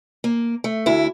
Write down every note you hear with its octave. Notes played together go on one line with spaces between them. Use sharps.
A#3
A3
D2 E4